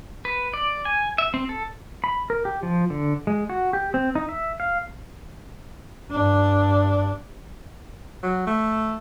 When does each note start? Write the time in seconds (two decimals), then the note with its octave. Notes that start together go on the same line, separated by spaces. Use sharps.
0.25 B4
0.54 D5
0.85 G#5
1.18 E5
1.34 C4
1.49 A4
2.04 B5
2.30 A#4
2.45 G4
2.63 F3
2.90 D3
3.27 G#3
3.50 F#4
3.73 G4
3.94 C4
4.15 D#4
4.29 E5
4.60 F5
6.11 G2 D4
8.23 F#3
8.47 A3